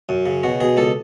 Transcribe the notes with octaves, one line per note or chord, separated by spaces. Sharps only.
F#2
C#3
B2 F#4
B2 G#4
C#2 A4